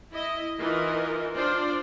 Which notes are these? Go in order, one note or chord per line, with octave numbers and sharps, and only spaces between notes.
E4 D#5
E3 D#4 F4 A#4 D#5
D4 F4 C5 D5